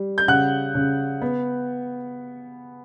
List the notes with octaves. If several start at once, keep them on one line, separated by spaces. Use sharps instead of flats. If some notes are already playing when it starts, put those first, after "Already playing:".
Already playing: G3
G6
C#3 F#5 F#6
C#3
B3